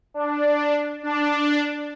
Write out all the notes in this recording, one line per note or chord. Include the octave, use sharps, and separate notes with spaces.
D4
D4